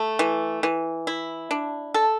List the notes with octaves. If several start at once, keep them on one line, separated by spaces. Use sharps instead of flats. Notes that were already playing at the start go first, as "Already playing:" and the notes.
Already playing: A3
E3
E3
E4
D4
A4